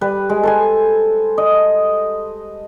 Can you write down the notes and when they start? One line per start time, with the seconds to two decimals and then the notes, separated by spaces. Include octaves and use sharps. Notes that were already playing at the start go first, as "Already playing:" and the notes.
0.01 G3 B4
0.29 G#3
0.43 A4 C5 G#5
1.38 D#5